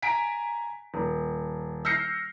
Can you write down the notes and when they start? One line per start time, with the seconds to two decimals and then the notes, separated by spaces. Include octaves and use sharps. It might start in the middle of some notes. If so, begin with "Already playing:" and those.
0.02 G#5 A#5 B6 D7
0.94 D#1
1.85 E6 F6 G6 A#6 C7 C#7